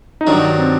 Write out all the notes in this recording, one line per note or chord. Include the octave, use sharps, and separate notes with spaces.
D#4
G2 D#3 F#3 D4
C4